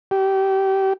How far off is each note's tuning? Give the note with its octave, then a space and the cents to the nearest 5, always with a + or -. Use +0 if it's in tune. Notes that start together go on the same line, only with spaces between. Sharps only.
G4 -25